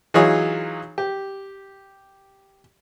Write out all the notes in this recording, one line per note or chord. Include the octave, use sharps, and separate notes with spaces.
E3 F#3 D#4 F4 G#4 C#5
G4